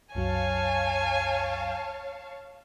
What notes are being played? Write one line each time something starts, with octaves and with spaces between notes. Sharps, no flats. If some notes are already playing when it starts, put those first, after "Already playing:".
C2 F#2 F#3 C#5 F5 G#5 A5